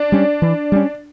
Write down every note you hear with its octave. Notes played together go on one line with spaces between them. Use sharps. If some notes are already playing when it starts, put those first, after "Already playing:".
Already playing: D4
G3 C#4
E3
G3 C#4